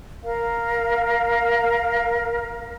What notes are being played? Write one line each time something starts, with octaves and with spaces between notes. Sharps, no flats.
A#4 F5